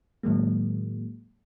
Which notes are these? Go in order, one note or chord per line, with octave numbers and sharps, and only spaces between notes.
A2 D#3 F#3 G#3 A#3